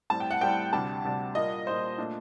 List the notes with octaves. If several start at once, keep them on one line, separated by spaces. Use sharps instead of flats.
A2 G3 C4 A5
G5
F#5
A2 G3 C4 G5
D2 C3 G3 D4 A5
D2 C3 G3 D4
A#2 G3 A#3 D#5
A#2 G3 A#3 C5
A#2 A3 D4